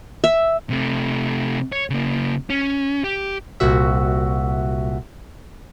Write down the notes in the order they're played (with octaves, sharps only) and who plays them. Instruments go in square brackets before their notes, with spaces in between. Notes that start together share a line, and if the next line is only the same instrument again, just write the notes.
[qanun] E5
[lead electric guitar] C3 A3
C#5
C#3 A#3
C#4
G4
[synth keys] C2 A#2 F#4 E5